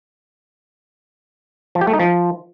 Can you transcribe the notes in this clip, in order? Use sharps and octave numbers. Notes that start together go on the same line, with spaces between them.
F3
G4
A3
D#4
F3